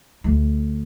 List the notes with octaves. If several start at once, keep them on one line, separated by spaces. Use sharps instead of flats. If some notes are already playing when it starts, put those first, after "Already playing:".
D2